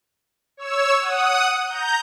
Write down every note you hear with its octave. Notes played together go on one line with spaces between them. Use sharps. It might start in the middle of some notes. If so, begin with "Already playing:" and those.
C#5 E6
F#5 D#6
A#5 G6